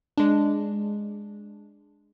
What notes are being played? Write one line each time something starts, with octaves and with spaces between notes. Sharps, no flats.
G#3 D4